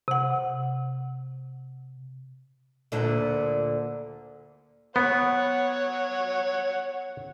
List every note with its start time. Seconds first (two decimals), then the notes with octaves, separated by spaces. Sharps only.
0.08 C3 F#5
2.92 D2 A#2 D3
4.96 B3 C#5 F#5